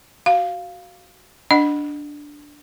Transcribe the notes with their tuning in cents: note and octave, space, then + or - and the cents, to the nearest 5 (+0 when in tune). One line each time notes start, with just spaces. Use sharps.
F#4 +10 F5 +0
D4 -5 D#5 -25 F#5 +0